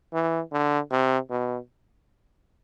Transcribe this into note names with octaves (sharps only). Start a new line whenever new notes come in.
E3
D3
C3
B2